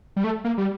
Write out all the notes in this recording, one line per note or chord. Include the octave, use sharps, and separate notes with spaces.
G3
A3
A#3
G3